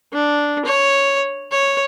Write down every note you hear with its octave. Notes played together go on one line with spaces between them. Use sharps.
D4
C#5
C#5